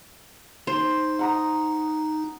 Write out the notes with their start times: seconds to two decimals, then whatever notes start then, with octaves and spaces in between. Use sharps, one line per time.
0.67 D#4 C5
1.19 F#5 A#5 D#6